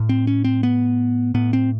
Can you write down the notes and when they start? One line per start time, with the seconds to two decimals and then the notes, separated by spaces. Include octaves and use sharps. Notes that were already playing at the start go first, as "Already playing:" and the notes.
Already playing: A2
0.09 C4
0.27 C#4
0.44 C4
0.63 B3
1.34 A2 B3
1.53 C4